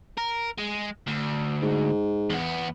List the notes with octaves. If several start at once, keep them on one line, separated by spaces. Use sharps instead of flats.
A#4
G#3
D2
G#2
E2 B3